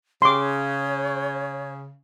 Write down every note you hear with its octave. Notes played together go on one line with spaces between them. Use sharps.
C#3 G4 C6 D6
C#5